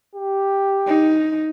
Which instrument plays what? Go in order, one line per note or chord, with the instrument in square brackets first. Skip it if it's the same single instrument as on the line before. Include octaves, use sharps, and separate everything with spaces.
[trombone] G4
[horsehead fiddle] D#4